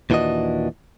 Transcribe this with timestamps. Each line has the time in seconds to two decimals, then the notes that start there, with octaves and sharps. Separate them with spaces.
0.10 D#2 A#2 E3 D4 F#4 D#5